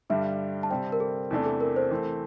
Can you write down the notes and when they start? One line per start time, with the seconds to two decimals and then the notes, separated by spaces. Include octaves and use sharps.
0.10 G2 D3 G3 D4 E5
0.63 A5
0.70 C3 G3 C4 G5
0.92 A#4
1.00 A4
1.31 E2 C3 E3 A3 D4
1.46 A4
1.60 A#4
1.76 C5
1.91 E3 A3 C4